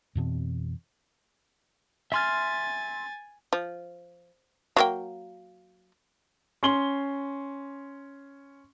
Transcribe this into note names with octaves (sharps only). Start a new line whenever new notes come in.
F2 B2 E3 C4
E5 G#5 C6 F6 A6
F3
F#3 A#3 G5
C#4 C6 G7